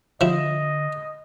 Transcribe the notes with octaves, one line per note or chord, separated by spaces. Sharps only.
D3 F3 E4 D#5